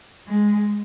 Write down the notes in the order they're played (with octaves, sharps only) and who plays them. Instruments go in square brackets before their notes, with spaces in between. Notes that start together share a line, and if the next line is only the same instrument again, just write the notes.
[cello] G#3